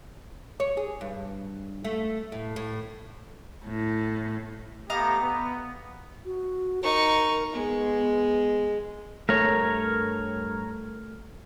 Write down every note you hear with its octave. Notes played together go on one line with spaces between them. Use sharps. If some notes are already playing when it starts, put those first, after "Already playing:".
C#5
G#4
G2
A3
A2
A2
A2
A3 B3 G4 D#5 F5 A#5
B3
F#4
D#4 A#4 C#6
G#3 B3
G2 A3 A#4 C#5